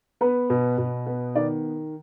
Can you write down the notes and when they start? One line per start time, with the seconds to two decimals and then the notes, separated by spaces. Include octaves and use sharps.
0.21 B3 B4
0.50 B2
0.78 B2
1.06 B3
1.35 D#3 D5